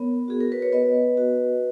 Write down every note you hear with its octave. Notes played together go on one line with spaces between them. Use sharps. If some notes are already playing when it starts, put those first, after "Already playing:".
Already playing: B3 A#4 C#5
F#4 G#4
A#4
B4
C#5
B3 B4 D#5
F#4